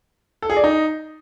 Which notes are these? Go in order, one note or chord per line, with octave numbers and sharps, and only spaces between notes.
A4
G#4
D5
D#4